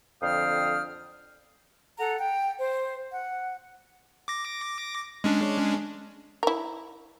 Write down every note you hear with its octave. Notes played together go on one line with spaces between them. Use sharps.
F2 D3 F5 G5 D#6 F6
A4 F#5 A#5
G5
C5
F#5
D6 A#6
G#3 C#4 D4
E4 A#4